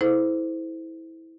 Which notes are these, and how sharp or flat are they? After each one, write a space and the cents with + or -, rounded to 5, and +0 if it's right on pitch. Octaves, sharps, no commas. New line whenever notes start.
E4 -20 A4 -20 C5 -20